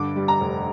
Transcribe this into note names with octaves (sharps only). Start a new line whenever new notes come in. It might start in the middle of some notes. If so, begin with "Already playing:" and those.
Already playing: G2 D3 D6
G3
A#5
F1